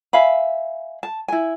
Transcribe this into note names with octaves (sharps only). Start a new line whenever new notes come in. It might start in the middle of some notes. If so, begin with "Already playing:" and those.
E5 F5 G#5 B5
A5
E4 G#5